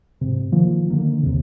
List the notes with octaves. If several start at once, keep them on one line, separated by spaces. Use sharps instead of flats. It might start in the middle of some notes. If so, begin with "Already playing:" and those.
G#2 C3
D#3 F3 A#3
D3 D#3 A#3
D#2 C3